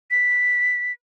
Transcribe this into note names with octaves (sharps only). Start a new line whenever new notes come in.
B6